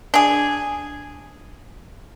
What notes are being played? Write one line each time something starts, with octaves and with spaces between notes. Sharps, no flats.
D4 G#4